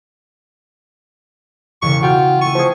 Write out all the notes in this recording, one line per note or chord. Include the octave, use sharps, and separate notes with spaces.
E1 C#3 C#6
F4 F#4 G5 F6 G6
A3 C#6 D#7
F3 C4 G#4